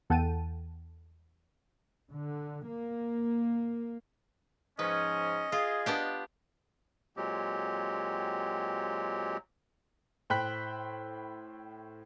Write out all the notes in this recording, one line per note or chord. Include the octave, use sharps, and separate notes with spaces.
E2 A4 F#5 G5 A5 D#7
D3
A#3
G#2 F3 C#4 B4 D#5
F4 G#4
B3 D4 G4
A#2 F#3 G#3 C4 G4
A2 C5 G5 B5 F#6 B6